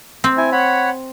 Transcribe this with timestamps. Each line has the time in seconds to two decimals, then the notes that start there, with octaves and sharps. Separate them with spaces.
0.24 C4
0.37 E4 G#5
0.52 C#5 F#5 B5